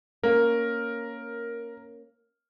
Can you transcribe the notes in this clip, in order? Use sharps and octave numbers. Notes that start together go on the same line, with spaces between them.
A#3 C#4 A#4